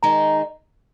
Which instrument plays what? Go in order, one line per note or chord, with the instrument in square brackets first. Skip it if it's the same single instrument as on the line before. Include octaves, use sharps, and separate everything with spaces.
[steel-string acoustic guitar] D#3 G#3 D#4 [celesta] A#5